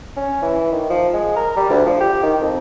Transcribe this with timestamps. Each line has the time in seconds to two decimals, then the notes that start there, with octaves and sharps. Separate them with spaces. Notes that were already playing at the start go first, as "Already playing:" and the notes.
0.16 C#4
0.42 E3
0.72 D#3
0.90 F3
1.14 G#3
1.36 A#4
1.57 G3
1.69 D2
1.86 F3
2.00 G4
2.23 D#3
2.41 F2